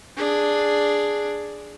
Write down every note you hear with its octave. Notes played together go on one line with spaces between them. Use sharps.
D4 G#4